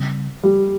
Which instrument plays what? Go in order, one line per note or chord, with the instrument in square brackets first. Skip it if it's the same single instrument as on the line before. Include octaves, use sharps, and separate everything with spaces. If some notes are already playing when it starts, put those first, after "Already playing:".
Already playing: [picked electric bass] C#3 G3 C4
[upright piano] G3